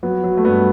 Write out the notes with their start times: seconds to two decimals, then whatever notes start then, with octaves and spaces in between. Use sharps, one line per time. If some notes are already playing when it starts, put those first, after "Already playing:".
0.03 F#3 B3
0.24 F#3
0.37 A3
0.45 G2 B3